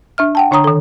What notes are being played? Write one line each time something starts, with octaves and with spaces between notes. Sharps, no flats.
D4 E5 F6
F#5 G5 A5
D3 D4 C#5 A#5 D#6
D#3 A4